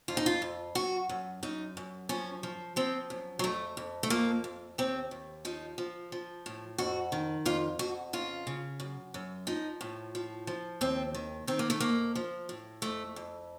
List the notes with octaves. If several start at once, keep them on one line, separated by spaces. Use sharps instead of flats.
F2 F4
D#4
F4
F2
F#2 F#4
F#2
F#2 D#4
F#2
F3 C#4
F3
F3 C4
F#2
F#3
F2 A3
F2
A3
F3 A#3
F2
D#2 C4
D#2
F3 D#4
F3
F3
A2
F2 F#4
D#3
F2 F4
F2 F#4
C#3 F4
C#3
F#2
F#2
F3 D#4
A2
F3
F3
D#2 C4
D#3
D#3 C4
A#3
A3
F2 A#3
F3
A2
F2 A3
F2